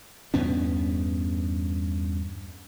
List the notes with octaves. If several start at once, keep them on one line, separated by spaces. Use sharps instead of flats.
E2 G2 B3 C#4